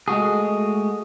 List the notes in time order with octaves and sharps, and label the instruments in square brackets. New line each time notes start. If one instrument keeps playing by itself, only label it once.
[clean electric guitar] G#3 A3 F#4 G#4